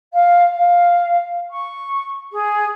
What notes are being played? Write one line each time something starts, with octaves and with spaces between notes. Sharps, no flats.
F5
F5
C#6
G#4